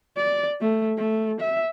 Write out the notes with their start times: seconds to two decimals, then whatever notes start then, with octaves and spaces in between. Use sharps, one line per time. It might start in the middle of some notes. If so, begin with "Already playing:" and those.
0.17 D5
0.60 A3
0.97 A3
1.41 E5